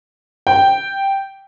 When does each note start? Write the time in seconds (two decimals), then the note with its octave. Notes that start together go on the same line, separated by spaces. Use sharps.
0.47 G5